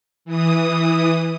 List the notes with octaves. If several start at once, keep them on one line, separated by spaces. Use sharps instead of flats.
E3 D#6